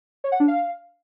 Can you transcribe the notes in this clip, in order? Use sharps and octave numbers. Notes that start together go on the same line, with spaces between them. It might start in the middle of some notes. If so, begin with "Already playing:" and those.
C#5
F#5
D4
F5